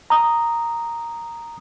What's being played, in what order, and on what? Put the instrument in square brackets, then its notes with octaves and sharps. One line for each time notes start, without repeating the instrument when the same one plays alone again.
[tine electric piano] A#5 D#6